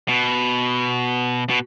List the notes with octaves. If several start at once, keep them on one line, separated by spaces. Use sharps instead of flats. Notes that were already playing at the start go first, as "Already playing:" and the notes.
B2
B2